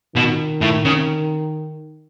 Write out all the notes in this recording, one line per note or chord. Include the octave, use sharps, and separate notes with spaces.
B2 D#3
A2
C#3